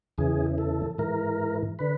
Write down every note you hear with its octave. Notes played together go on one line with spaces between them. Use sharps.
E2 C#3 E3 G#4
A4
G#2 E3 A#4
D3 B4